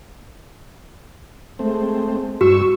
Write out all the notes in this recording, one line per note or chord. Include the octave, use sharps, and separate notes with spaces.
G#3 A3 C4
G2 F#4 C#6 E6